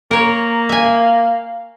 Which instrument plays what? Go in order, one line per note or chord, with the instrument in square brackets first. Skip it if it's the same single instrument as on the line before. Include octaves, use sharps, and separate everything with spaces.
[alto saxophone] A#3 [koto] A#4 C#5 [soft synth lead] A#5
[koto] E5 G#5 [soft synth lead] F5